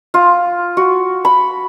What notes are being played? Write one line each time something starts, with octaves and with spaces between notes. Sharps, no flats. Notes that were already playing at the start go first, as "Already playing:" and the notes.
F4
F#4
B5